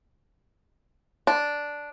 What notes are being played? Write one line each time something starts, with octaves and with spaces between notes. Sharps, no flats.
D4